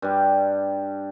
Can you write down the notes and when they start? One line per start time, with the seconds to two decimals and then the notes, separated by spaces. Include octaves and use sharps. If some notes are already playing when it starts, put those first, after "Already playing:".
0.02 G2 G3